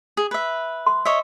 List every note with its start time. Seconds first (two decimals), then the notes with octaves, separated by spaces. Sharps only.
0.17 G#4
0.31 B4 E5
0.87 C6
1.05 C#5 D#5 E5